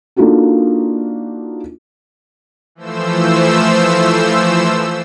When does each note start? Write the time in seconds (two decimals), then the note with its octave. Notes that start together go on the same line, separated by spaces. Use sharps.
0.16 A#3 D4 D#4 F4 F#4 A4
2.75 E3 F3 A3 C5 E6